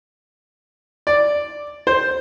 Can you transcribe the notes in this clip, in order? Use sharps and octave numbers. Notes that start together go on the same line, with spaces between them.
D5
C5